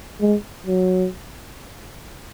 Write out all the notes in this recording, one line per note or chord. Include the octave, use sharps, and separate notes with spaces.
G#3
F#3